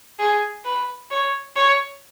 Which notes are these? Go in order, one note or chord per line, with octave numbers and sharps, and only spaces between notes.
G#4
B4
C#5
C#5